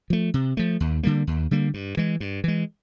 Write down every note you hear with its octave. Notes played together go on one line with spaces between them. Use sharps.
F3 A3
C3
F3 A3
D#2
D3 G3 A#3
D#2
D3 G3 A#3
G2
E3 G#3
G2
E3 G#3